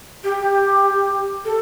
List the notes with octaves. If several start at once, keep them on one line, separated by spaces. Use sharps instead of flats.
G4
A4